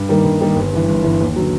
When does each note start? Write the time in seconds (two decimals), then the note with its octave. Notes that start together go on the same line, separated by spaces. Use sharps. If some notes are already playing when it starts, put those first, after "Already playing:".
Already playing: G2
0.09 D#3 G3 A#3 D#4
0.24 G2
0.41 D#3 G3 A#3 D#4
0.56 G1
0.72 G2 E3
0.88 G1
1.04 G2 E3
1.20 D#2
1.36 D3 F#3